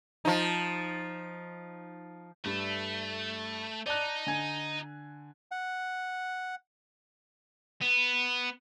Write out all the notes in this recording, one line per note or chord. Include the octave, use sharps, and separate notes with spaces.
F3 D#4
G2 A3
D#4 D5 A5 F#6
D3 G#5 G#6
F#5
B3